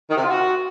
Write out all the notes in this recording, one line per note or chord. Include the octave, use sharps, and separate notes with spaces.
D#3
C3
F4
F#4